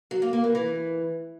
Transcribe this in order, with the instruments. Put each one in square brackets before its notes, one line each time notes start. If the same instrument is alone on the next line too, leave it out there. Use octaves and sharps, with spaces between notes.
[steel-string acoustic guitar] F#3
A#3
A#3
E3
E3